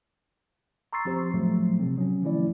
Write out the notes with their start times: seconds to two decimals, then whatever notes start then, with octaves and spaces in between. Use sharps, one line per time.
0.93 A#5 C6 C#6 E6 A6 C7
1.05 F3 C4 G4 C5
1.34 A2 F3 F#3 A3
1.79 C3 C4
1.98 F#3 C#4
2.22 D#3 F3 A3 C#4 E4 D5